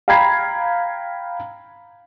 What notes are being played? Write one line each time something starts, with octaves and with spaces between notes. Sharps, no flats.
F5 G5 A#5 B5 G#6 C7